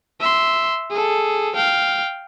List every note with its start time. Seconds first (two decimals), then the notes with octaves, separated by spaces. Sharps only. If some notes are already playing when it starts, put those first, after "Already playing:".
0.20 E5 C6
0.91 G#4 A4
1.56 F5 G5